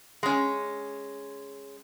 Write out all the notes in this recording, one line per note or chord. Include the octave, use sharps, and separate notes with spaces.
G#3 C#4